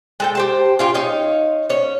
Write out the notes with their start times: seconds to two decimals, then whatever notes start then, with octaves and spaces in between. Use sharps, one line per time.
0.20 G#3 A4 G5
0.35 G4 C5 A5
0.79 C#4 F4 G4
0.94 D#4 C#5 F5
1.70 C#4 C#5